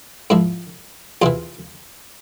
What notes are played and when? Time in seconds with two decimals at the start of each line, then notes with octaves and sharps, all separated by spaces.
0.30 G#2 F3 E4
1.22 E2 C3 E3 F4